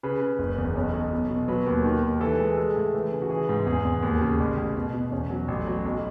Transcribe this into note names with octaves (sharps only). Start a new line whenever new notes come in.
C#3 B4
C#3
F#1
E2
B1 C#5
B1
B2
B2
F#3 B4
D#2
D#3
D#2
E3 A4
G#3
G#3 A4
A2
E3
C#3
F#4
E3 G#4
G#2
E2 G#4
E2
D#2
C#3
A1
A1
B2
B2
E2 C#4
F#3
A1
F#3
B1